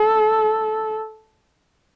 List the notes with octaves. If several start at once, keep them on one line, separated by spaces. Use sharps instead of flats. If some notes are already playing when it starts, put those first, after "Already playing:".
Already playing: A4